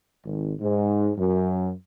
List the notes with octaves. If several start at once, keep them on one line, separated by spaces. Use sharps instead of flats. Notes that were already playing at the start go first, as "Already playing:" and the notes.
G#1
G#2
F#2